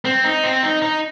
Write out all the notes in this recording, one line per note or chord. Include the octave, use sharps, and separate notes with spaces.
C4
D#4
C4
D#4
D#4